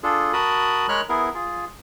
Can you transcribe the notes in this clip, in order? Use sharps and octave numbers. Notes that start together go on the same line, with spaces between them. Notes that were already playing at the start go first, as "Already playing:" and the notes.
D4 F4 G#4 A4
F#4 A#4 A5 B5 D#6
G#3 A#4 C#5 B5 F6 F#6
B3 E4 G#4 A#4
F4 G#4